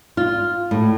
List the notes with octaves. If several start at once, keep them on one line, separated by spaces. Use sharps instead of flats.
F4
A2